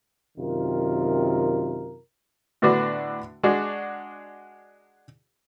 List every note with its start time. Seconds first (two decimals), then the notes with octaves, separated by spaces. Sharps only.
0.38 F#2 C3 D#3 F4 A#4
2.62 A2 D3 B3 D4 F#4
3.43 G#3 D4 F#4